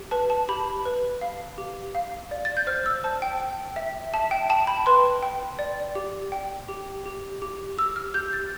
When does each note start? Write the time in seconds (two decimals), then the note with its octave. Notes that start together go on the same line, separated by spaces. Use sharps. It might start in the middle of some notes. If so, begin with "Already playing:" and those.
Already playing: G4
0.11 B4 A5
0.30 A5
0.49 G4 B5
0.85 B4
1.21 F5
1.58 G4
1.95 F5
2.31 D5
2.45 A6
2.57 G6
2.67 C5 F6
2.86 E6
3.04 C5 A5
3.22 G5
3.40 G5
3.76 E5
4.14 E5 A5
4.31 G5
4.49 G5 A5
4.67 B5
4.86 B4 C6
5.23 G5
5.59 D5
5.95 G4
6.32 G5
6.69 G4
7.06 G4
7.42 G4
7.78 G4 E6
7.96 F6
8.14 G4 G6
8.33 A6